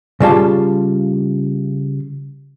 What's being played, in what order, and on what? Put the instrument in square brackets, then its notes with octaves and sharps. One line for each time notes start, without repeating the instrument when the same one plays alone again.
[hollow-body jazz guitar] C#3 G3 F4 A5